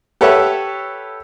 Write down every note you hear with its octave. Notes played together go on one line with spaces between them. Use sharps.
G4 A4 B4 C#5 E5 F#5